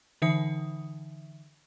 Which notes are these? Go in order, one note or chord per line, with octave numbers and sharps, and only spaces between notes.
D3 E3 D#4 E5 D#6 C#7